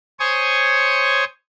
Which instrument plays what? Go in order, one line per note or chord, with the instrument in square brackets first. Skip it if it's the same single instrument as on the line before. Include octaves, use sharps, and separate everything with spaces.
[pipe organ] C5 C#5 G#5 C#6 D#6